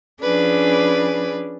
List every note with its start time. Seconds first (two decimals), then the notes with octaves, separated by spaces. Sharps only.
0.21 F3 C#4 D4 G#4 B4 D5